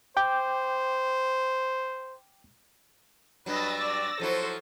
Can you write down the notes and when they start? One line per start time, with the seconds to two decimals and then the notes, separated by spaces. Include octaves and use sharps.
0.17 C5 G5 D6 G6
3.46 G2 F#3 B4 D#5 E6 A6 A#6
3.79 D5
4.20 F3 F#3 E4 F#4 A4 C5